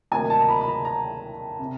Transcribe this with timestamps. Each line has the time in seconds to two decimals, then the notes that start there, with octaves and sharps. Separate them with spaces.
0.11 D2 C3 D#3 F#3 A#3 G#5
0.30 A5
0.41 A#5
0.49 B5
0.61 B5
0.68 A#5
0.85 A#5
1.59 C3